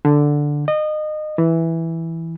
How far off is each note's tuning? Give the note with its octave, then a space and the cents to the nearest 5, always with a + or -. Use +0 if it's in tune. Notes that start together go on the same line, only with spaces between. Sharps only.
D3 +0
D#5 -25
E3 -5